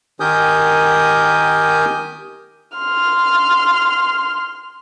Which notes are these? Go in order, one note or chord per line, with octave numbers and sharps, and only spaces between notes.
D#3 G4 A#4 G#5 D#6 G6
C6 F6